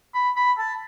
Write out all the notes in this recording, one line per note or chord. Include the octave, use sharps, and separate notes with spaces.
B5
B5
A5